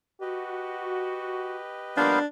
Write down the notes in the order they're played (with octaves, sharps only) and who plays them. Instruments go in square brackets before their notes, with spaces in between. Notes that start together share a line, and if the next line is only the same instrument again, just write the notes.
[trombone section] F#4 [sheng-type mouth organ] G4 B4 D#5
[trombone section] F3 G3 A#3 [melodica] B3 C5 F5 [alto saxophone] D4